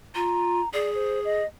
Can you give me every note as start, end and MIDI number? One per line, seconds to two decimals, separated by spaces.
0.15 0.61 65
0.15 0.69 82
0.74 1.41 68
0.74 0.93 74
0.95 1.20 72
1.25 1.46 75